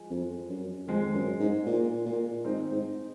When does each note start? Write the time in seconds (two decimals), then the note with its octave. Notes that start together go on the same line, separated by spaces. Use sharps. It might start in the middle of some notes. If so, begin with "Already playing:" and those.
Already playing: F3 G#3
0.10 F2
0.49 F#2
0.87 F2 G#3 C4
1.14 F#2
1.40 G#2
1.67 A#2
2.06 A#2
2.44 G#2 C4 D#4
2.71 G#2